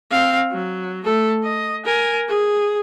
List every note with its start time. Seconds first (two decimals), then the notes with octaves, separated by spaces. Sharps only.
0.11 C4 F5
0.51 F#3
1.05 A3 A4
1.43 D#5
1.85 A#4 G#5
2.28 G#4